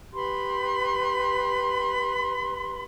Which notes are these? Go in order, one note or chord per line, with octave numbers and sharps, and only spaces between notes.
G4 B4 B5 C6